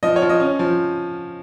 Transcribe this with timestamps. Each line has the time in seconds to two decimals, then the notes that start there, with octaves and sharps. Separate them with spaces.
0.03 F3 D#5
0.16 C#5
0.22 F3
0.29 D#5
0.40 C#4
0.59 F3